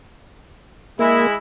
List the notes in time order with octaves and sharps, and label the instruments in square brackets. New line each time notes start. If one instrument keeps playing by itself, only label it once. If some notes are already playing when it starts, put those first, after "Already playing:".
[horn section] G#3 E4 [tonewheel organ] A#3